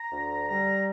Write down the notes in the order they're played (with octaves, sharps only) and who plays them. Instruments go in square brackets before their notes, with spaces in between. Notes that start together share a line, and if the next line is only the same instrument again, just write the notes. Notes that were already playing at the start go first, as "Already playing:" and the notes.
Already playing: [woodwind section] A#5
D2
G3 A#5